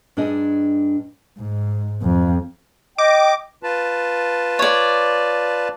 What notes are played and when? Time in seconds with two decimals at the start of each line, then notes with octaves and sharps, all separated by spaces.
0.17 G2 D4 D#4 G#4 D#5
1.39 G#2
2.03 F2
2.98 D#5 G5 D6
3.63 F4 B4 A5
4.59 C#5 D5